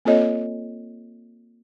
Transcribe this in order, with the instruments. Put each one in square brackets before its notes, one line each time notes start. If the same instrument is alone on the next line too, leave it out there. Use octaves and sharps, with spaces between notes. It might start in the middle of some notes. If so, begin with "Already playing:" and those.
[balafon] A#3 C4 F4 A4 C#5 D#5